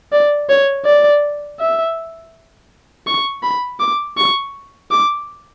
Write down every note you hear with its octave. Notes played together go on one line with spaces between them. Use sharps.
D5
C#5
D5
E5
C#6
B5
D6
C#6
D6